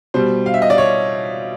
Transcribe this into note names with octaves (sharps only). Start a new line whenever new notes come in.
B2 G3 C5
F5
E5
D#5
D5
C#5